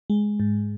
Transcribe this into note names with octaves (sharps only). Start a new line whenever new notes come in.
G#3
G#2